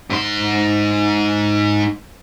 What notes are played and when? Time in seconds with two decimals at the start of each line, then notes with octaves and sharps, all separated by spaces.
0.10 G#2 C6